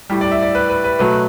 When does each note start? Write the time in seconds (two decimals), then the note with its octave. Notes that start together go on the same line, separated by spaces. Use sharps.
0.10 A2 G3
0.21 D5
0.31 E5
0.42 D5
0.55 B4
0.69 B4
0.84 B4
0.99 B2 F#3 A3 B4